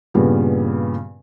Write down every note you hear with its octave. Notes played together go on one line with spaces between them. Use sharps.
G2 A#2 C#3 G3 B3